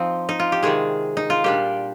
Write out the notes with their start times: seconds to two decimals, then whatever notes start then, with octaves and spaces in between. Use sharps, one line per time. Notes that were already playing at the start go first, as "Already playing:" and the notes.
Already playing: F3 C4 D#4
0.29 D#4
0.40 F4
0.52 G4
0.63 C3 D#3 G#3 G#4
1.17 D#4
1.30 F4
1.44 A#2 G3 D4 G4